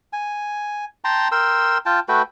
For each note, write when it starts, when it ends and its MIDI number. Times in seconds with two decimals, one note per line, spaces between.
0.13 0.85 80
1.04 1.28 79
1.04 1.28 81
1.04 1.28 82
1.04 1.28 84
1.32 1.78 70
1.32 1.78 79
1.32 1.78 84
1.32 1.78 88
1.86 2.00 65
1.86 2.00 79
1.86 2.00 81
2.09 2.22 57
2.09 2.22 66
2.09 2.22 71
2.09 2.22 79